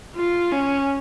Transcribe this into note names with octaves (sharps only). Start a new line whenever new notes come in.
F4
C#4